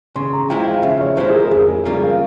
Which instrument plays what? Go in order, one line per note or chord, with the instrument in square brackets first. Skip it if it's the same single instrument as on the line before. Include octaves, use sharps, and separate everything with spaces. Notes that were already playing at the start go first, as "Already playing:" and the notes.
[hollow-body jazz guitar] C#3 [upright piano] C6
[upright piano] A#5
[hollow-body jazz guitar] F3 G#3 E4 [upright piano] G5
[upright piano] F5
[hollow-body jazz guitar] C#3 [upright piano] E5
[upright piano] C#5
[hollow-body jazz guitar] F3 G#3 E4 [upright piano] C5
[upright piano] G#4
A#4
[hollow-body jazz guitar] F2 [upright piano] G#4
[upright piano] G#4
[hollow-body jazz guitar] C#3 G3 A#3 F4 [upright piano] A#4
[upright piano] F5